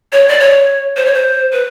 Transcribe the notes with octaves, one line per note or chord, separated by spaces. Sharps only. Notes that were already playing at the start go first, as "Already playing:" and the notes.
C#5
D5
C#5
C5
C#5
C5
B4